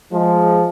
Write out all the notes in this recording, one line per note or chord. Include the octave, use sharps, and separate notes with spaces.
F3 G#3